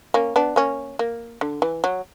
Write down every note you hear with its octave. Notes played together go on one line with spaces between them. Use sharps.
A#3 C#4
B3 D4
A#3 C#4
A#3
D3
E3
F#3